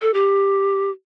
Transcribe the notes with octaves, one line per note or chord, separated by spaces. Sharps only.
A4
G4